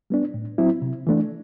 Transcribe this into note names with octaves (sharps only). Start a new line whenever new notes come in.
G3 B3 D4
A2
F#3 C4 E4
C3
E3 A3 D4